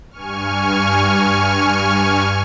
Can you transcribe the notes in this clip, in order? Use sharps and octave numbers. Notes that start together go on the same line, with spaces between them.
G2 G#5 C#6 F6